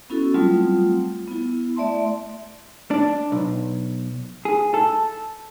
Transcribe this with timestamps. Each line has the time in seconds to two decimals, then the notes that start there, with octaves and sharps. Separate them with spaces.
0.10 B3 C#4 E4 F#4 A4
0.34 F#3 G3 A3 C4 F4
1.28 B3 E4
1.76 A3 D5 E5 A5 C6
2.91 D4
3.32 B1
4.45 G#4
4.74 A4